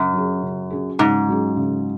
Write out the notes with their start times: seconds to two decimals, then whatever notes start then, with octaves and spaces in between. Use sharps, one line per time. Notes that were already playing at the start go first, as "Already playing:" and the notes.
Already playing: F#2 C#3
0.13 F#3 C#4 G#4
0.42 C#3
0.70 F#3 C#4 G#4
0.99 G#2 C#3
1.28 F#3 C#4 G#4
1.57 C#3